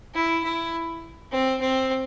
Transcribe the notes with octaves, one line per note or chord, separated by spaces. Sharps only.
E4
E4
C4
C4